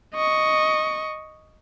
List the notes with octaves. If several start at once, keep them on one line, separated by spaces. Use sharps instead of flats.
D#5 C#6